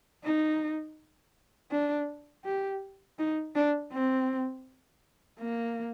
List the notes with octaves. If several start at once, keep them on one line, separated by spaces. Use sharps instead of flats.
D#4
D4
G4
D#4
D4
C4
A#3